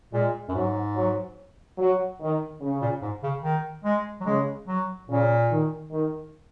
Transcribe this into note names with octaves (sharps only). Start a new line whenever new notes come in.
A#2 G#3
F#2
G#2 F#3
F#3
F#3
D#3
C#3
A#2
G#2
C#3
D#3
G#3
F#3
C#3 G#3
F#3
A#2 C#3
D#3
D#3